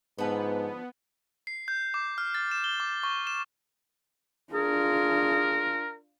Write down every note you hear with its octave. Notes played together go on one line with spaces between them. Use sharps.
G#2 D3 F3 B3 B4
C7
G6
D6
F6
A6
E7
G7
D6
C#6
E7
D4 F4 G#4 A#4